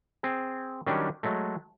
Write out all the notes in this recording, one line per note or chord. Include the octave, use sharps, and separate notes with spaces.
C4 G#4
D#3 F#3 G3 C#4 D4
F#3 G#3 A3